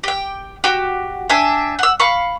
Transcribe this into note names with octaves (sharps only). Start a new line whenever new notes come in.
G4 G5
F#4 G4
D4 E5 G5 G#5
F#5 E6
F5 B5 C#6